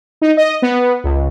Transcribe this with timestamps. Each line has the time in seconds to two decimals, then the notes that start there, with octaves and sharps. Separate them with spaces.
0.22 D#4
0.37 D#5
0.62 B3
1.04 C#2